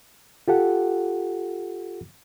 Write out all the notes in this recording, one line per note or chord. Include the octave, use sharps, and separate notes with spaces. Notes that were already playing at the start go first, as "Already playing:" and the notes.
F4 G4 A4 F#5